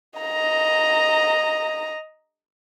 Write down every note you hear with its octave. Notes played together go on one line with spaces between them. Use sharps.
D#5 A#5